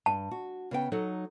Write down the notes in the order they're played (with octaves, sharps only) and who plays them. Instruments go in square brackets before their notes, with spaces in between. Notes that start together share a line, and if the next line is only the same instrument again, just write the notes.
[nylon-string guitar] G2 [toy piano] A5
[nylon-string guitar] F#4
C#3 B3 G5
F#3 D#4 A4